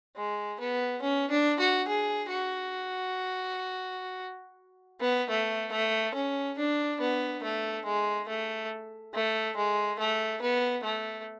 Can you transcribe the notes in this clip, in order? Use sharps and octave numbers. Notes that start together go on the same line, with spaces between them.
G#3
B3
C#4
D4
F#4
G#4
F#4
B3
A3
A3
C#4
D4
B3
A3
G#3
A3
A3
G#3
A3
B3
A3